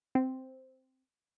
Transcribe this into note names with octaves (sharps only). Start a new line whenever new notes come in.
C4